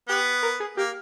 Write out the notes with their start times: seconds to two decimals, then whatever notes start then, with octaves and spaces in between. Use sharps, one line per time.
0.09 B3 G4
0.43 A#4
0.60 G#4
0.77 A#3 G4